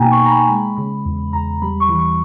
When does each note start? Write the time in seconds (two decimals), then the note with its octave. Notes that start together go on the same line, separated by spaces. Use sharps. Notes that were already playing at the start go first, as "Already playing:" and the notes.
Already playing: B2 A#3 D#4 G5 G#5 A#5
0.12 C#6
0.22 B2 A#5
0.31 B5
0.49 G#3 B5
0.77 C#3 B5
1.05 E2
1.33 E2 A#5
1.62 G3 B5
1.80 C#6
1.89 E3
1.99 C#6